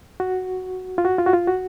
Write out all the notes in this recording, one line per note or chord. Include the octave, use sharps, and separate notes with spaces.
F#4
F4
F#4
F4
F#4
F4
F#4